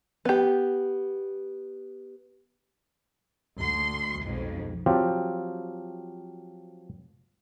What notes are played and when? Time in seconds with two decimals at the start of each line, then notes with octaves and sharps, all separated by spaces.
0.25 B3 G4
3.56 D2 C6
4.24 B1 F2 G#2
4.86 F3 F#3 C4 F4 G4